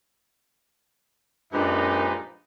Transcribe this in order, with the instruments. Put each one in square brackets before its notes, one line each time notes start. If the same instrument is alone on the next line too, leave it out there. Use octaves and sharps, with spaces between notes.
[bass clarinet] F#2 [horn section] A#2 F3 D#4 [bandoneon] G#3 G4 B4 [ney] D4